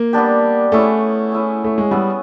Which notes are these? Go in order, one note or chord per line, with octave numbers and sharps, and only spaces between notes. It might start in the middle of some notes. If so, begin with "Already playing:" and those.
Already playing: A#3
G3 B3 D4 G4
A3 C#4 E4 G#4
C#4 E4 G#4
A3
G#3
G3 B3 E4 G#4